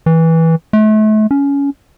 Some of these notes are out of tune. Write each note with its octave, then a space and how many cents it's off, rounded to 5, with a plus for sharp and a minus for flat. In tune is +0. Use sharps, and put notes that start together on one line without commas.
E3 -15
A3 -35
C#4 +20